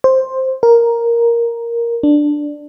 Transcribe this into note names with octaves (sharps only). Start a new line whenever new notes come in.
C5
A#4
D4